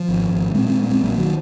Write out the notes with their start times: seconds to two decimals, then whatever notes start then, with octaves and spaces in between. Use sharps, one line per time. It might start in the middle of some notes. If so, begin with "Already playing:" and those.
Already playing: F3
0.09 G#1
0.31 G#1
0.54 A#2 G#3 C4
0.67 G#3 C4
0.79 A#2 A#3
0.90 G#3 C4
1.02 A#1 F#3 A#3
1.17 D#3 F#3